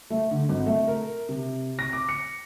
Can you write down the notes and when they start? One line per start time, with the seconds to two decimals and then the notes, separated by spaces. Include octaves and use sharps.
0.10 A3
0.31 D3
0.49 G#1
0.66 A3
0.87 A#4
1.29 C3
1.79 A#6
1.93 D6
2.09 C#7